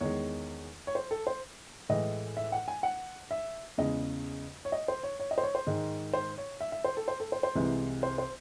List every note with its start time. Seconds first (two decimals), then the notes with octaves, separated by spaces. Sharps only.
0.01 E2 D#3 G#3 C#5
0.87 C#5
0.95 C5
1.11 A4
1.27 C5
1.89 A2 E3 G#3 D#5
2.37 E5
2.52 F#5
2.68 G#5
2.83 F#5
3.31 E5
3.78 E2 C#3 G#3 D#5
4.65 C#5
4.72 D#5
4.88 C5
5.03 C#5
5.20 C#5
5.31 D#5
5.38 C5
5.43 C#5
5.55 C5
5.67 G#2 D#3 G#3
6.13 C5
6.38 C#5
6.61 E5
6.72 E5
6.84 C5
6.97 A4
7.08 C5
7.20 A4
7.32 C5
7.43 C5
7.55 C2 C3 E3 G#3
8.03 C5
8.18 C5